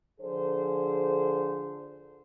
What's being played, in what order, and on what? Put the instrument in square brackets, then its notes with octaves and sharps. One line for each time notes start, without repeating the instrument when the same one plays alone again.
[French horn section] D3 F3 G#4 A4 C5